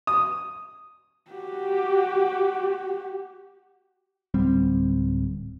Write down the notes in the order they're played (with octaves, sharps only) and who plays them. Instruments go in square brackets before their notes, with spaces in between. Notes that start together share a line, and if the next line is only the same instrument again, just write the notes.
[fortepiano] D#6
[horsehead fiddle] F#4 G4
[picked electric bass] D1 G3 C4